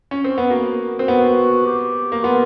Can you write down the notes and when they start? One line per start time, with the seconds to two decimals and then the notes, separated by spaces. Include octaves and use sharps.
0.11 C#4
0.24 C4
0.38 B3
0.50 A#3 F#4
0.99 C4
1.08 B3
1.66 G4
2.12 A#3
2.24 B3 F4